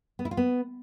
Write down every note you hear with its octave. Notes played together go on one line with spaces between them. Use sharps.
B3
E4
F4
B3